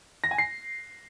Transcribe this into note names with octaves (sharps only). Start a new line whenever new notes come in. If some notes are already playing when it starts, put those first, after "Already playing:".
A#6
G#5
C7